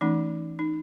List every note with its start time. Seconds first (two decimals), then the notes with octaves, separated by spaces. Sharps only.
0.01 E3 A3 C#4 D#4
0.59 D#4